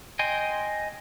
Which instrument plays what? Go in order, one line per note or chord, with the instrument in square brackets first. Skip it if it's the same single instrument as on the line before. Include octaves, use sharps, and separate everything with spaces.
[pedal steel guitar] D#5 G5 G#5 C6